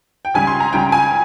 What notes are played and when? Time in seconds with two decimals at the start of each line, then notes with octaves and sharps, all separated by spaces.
0.25 G5
0.34 C#2 C#3 G3 G#5
0.47 C6
0.60 A#5
0.73 C#2 C#3 G3 G5
0.92 G#5